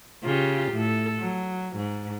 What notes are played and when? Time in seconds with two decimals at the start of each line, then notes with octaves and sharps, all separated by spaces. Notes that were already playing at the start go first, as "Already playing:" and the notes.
0.23 C#3 F4 G4
0.72 A2 A4
1.19 F#3
1.76 G#2